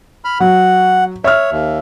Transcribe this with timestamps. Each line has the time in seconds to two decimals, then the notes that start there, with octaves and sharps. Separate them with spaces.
0.24 B5 F6
0.40 F#3 F#5
1.24 C#5 E5 F6
1.51 D#2